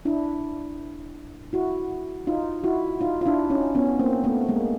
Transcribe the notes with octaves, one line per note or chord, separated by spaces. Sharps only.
D4 E4
E4 F#4
D#4 F4
E4 F#4
D#4 F4
F4
D4 E4
C#4 D#4
B3 C#4
A#3 C4
A3 B3
G#3 A#3